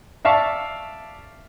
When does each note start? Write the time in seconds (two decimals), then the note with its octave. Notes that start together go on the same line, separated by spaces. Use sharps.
0.25 D5 E5 F5 A5 C#6